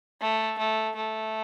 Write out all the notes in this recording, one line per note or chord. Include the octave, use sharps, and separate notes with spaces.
A3
A3
A3